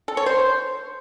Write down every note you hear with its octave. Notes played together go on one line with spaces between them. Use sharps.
A4
C#5
C5